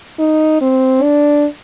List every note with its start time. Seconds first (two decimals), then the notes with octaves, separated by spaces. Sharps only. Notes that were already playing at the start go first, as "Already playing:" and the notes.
0.19 D#4
0.61 C4
1.02 D4